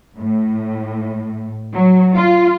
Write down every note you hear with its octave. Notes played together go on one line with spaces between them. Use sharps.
A2
F#3
F4